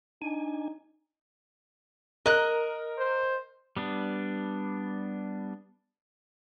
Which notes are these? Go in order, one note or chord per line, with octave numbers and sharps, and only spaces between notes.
D4 D#4 G#5
A#4 D#5 F#6
C5
G3 B3 D4